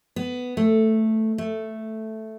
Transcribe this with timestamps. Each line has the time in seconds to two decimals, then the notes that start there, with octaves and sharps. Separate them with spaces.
0.16 B3
0.57 A3
1.38 A3